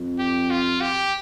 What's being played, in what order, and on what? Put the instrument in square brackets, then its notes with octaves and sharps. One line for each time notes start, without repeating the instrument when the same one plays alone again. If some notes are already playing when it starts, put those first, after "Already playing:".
Already playing: [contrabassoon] F2
[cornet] G4
F4
G4